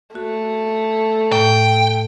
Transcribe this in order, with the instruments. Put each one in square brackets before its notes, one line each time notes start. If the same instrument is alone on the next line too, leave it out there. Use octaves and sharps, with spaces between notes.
[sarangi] A3 [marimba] F#4
[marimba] A2 [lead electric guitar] G5